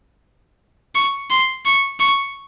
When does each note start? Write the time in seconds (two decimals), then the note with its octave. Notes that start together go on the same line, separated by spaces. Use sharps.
0.95 C#6
1.30 C6
1.65 C#6
2.00 C#6